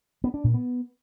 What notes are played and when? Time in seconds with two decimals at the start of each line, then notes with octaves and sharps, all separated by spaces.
0.24 B3
0.34 D4
0.44 A#2
0.54 B3